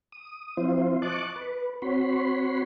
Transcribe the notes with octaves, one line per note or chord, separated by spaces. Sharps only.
D#6
F3 C4 E4 F4 C5
D#5 A5 C#6 D6 F#6
B4
C4 F#4 C#5 B5 C6